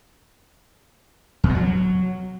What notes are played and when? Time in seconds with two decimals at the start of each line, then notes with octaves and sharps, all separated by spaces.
1.44 E2
1.49 B2
1.55 F#3